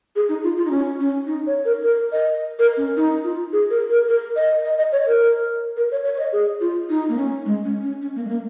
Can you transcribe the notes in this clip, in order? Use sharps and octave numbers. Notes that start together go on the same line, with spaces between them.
G#4
D#4
F4
F4
D#4
C#4
C#4
D#4
C#5
A#4
A#4
D#5
A#4
C#4
D#4
F4
G#4
A#4
A#4
A#4
D#5
D#5
D#5
C#5
A#4
A#4
C#5
C#5
C#5
D#5
G#4
F4
D#4
A#3
C#4
G#3
C#4
C#4
C#4
A#3
G#3
A#3